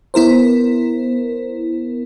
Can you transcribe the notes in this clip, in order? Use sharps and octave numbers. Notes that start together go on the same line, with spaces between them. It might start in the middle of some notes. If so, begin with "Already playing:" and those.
B3 E4 A#4 C5